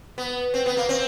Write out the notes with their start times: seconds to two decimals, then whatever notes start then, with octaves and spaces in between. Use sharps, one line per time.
0.18 B3
0.54 C4
0.66 B3
0.77 A#3
0.89 C4